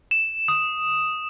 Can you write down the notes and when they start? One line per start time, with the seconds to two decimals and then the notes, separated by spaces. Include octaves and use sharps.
0.11 E7
0.48 D#6